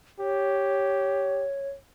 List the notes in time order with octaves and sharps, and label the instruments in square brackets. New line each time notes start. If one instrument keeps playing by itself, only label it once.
[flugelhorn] G4 [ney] C#5